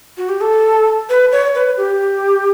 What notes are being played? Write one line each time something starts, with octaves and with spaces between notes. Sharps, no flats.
F#4
G4
A4
B4
C#5
B4
G4